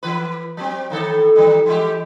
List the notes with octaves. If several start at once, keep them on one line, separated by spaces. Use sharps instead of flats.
E3 B4
F#3 C4
A2 D#3 A4
D#3 G3
E3 G#3 G4